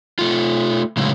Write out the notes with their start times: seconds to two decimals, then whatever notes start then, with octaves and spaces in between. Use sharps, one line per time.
0.19 A3 F4
0.97 A2 C#3 F#3 G#3 E4